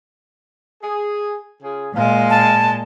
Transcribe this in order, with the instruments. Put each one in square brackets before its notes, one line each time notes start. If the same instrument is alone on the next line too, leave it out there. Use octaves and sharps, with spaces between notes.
[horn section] G#4
C#3 F4 G#4
[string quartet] A#2 G#3 [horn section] F5
[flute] A5